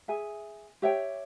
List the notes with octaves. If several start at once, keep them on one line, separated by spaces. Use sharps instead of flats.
G#4 E5 G#5
G4 C#5 E5 G5